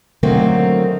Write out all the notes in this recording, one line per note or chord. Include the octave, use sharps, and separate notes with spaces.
D3 D#3 F#3 A3 A#3 C4